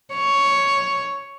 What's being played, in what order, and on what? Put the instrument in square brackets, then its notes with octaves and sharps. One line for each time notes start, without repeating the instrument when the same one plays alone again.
[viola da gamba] C#5